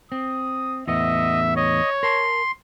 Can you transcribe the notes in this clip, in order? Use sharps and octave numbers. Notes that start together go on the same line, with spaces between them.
C4 D#6
E2 A2 B3 D#5 E5
C#5 D#5
A#4 A5 C6